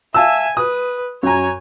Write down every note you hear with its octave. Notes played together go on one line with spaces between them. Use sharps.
E5 F5 G#5 A5 E6
B4 D#6
F#2 C#5 G#5 A#5